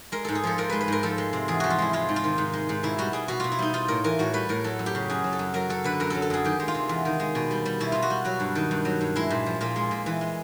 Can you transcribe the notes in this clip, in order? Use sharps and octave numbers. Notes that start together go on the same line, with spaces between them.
G#3 A#4
G#2 A4
G#4
F3 A4
G#2 A#4
G#3 B4
B4
G#2 A#4
F3 A4
G#3
C3
E2 G#4
F3 F#4
F4
G#3 E4
G#3 F4
G#2
F4
D#3
G#2
G#3
G#2
B2 E4
G3 F#4
G3 G#4
B2 F#4
B2 F4
E4
G3 D#4
G3 F4
A2 A#4
E3 A#4
A2 F#4
G3 B4
A2 A#4
F#3 A4
F#2
G4
C#3
F#2 G#4
F#3
A4
F#2
F#3 A#4
F#2 A4
D3 B4
F#2 A#4
F#3 A4
A4
F#2 G#4
D#3 G4
G#3
F4
C3
E2
D#3
G#3
B2
G3
G3
B2 E4
B2 F4
F#4
G3
F#3 F#4
G2
D#3
G2
F#3
G2
G#3 E4
A#2
F3
A#2 F4
G#3
A#2
E3
G#3